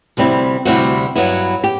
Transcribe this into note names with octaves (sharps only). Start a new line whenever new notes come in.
D2 C3 G3 C4 E4
D2 C3 G3 C4 E4 F#4
G2 F#3 B3 E4
G4